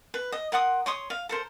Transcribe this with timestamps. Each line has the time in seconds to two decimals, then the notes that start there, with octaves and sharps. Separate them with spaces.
0.14 B4
0.32 D#5
0.52 A#4 F#5 C6 D#6
0.86 C#5 C6 D#6
1.10 F5
1.29 A4 A#4 C5